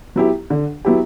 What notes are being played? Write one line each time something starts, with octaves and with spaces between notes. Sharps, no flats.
F#3 B3 E4 G4
D3
F#3 B3 E4 G4